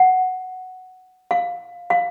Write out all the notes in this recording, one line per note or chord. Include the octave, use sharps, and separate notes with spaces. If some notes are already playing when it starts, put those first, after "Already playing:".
Already playing: F#5
F5
F5